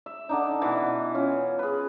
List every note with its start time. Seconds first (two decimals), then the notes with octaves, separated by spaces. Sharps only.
0.06 E5
0.29 D3 D4 D#4
0.62 B2 E3
1.15 C#4 F4
1.59 G#4 B4